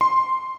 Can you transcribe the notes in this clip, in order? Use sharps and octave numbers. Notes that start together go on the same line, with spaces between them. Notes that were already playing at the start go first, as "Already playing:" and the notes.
C6